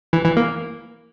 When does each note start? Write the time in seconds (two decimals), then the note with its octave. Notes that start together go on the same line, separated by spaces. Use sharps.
0.13 E3
0.25 E3
0.37 A#3